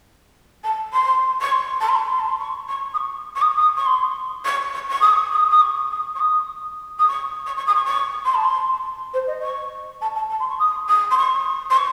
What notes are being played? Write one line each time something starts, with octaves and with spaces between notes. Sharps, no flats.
A5
C6
C#6
C6
A5
C6
A5
C6
A5
C6
C#6
C#6
D#6
C#6
C#6
D#6
D#6
C#6
C6
C#6
C#6
C#6
D#6
C#6
D#6
D#6
C#6
D#6
C#6
D#6
D#6
C#6
C#6
C#6
D#6
C#6
C#6
C6
A5
C6
C5
D#5
C#6
A5
A5
A5
C6
C#6
D#6
D#6
C6
C#6
C6
C#6